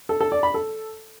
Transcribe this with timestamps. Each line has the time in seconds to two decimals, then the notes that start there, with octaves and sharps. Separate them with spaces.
0.09 A4
0.20 A4
0.32 D5
0.43 B5
0.54 A4